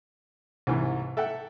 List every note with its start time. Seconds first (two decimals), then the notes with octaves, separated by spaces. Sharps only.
0.67 C2 G#2 E3
1.17 A4 E5 F#5 G5